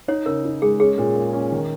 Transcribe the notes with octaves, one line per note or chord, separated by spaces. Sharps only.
D#4 C#5
C#3 A#4
D#4
G#3 G#4
C#4 G#4
A#2
A#3
C#4
D#3